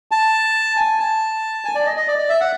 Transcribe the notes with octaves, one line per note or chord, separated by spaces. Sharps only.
A5
G#5
A5
G#5
D5
D#5
D#5
D5
D5
E5
F#5